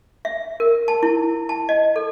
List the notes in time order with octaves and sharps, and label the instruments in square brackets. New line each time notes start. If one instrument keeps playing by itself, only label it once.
[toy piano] E5
A#4
A5
E4
A5
D#5
A4